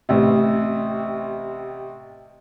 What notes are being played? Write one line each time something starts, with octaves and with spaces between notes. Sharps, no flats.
A1 C3